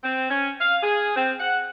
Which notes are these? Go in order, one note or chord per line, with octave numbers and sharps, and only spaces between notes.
C4
C#4
F5
G#4
C4
F#5